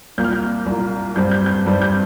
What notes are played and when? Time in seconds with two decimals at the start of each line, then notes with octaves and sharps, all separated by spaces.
0.18 C2 A#2 A#3 G6
0.24 F6
0.33 G6
0.66 C2 A#2 A#3
1.16 G2 G3 C4 G6
1.31 G6
1.46 G6
1.66 G2 G3 C4
1.82 G6